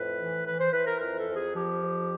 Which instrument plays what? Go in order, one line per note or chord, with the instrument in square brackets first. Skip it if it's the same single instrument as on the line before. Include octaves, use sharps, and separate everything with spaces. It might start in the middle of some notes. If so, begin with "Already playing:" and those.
Already playing: [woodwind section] F2 A2 B4
E3
E3 B4
C5
E3 B4
A#4
F2 A#4
A4
F2
G#4
F3 G4
F2